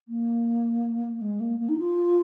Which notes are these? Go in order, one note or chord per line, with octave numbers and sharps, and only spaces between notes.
A#3
G#3
A#3
A#3
D#4
F4